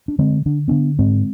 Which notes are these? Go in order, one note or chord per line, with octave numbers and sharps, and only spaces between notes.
D4
D3 G#3 C4
D3 D4
D3 B3 D4
G#2 G#3 C4